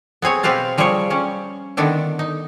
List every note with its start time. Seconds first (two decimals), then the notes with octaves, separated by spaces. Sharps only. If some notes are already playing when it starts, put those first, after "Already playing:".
0.22 B3 C4 G#4 C#5
0.43 B2 C4 G4 B4 F5 A5
0.78 F3 G3 G#4 C5 C#5
1.10 G3 C#4
1.77 D3 D#3 B3 D4 E4
2.19 D#4